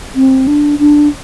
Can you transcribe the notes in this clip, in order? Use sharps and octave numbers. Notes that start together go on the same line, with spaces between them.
C4
D4
D4